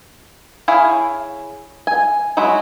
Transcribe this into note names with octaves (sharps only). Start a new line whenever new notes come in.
E4 G#4 C#5 F5
G#5
F#3 G#3 E4 F#4